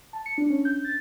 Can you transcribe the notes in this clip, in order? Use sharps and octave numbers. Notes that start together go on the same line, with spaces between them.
A5
C#7
D4
C#4
G6
A6